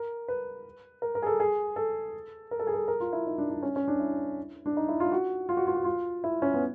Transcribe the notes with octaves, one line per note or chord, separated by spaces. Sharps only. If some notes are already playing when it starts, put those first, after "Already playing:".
Already playing: A#4
B4
A#4
A#4
G#4
A4
G#4
A4
A#4
A4
G#4
A4
A#4
F4
E4
D#4
D4
D4
C#4
C#4
D4
E4
D4
D#4
E4
F4
F#4
F4
F#4
F4
F#4
F4
E4
C#4
B3